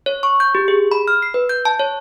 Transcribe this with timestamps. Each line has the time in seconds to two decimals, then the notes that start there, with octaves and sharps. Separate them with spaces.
0.06 C#5
0.23 C#6
0.40 G6
0.55 G4
0.68 G#4
0.91 B5
1.08 F6
1.22 C7
1.34 B4
1.49 G6
1.65 A5
1.79 C#5